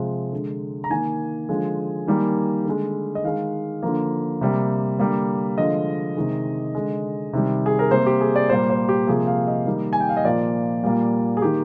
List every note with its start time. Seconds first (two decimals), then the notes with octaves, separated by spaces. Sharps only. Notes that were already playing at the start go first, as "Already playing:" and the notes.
Already playing: C3 F3 G#3
0.32 D3 G#3
0.84 A#5
0.90 D#3 A#3 G#5
1.49 D3 F3 G#3
2.08 D#3 G3 A#3
2.65 D3 G#3
3.15 D#5
3.24 D#3 G#3 F5
3.83 D3 F3 A#3
4.41 C3 G3 A#3
4.99 D3 G3 A#3
5.58 D3 F3 G#3 D#5
6.17 C3 D#3 G#3
6.75 D3 G#3
7.33 C3 D#3 G3
7.66 G#4
7.79 A#4
7.91 C3 G3 A#3 C5
8.06 G4
8.21 G#4
8.36 D5
8.49 A#2 G3 A#3 C5
8.70 C5
8.89 G4
9.07 C3 F3 A#3 G#4
9.27 F5
9.47 D#5
9.66 D#3 G3 A#3
9.93 G#5
10.00 G5
10.09 F5
10.17 D#5
10.25 A#2 F3 A#3 D5
10.83 A#2 G3 A#3
11.37 G#4
11.41 D#3 A#3 G4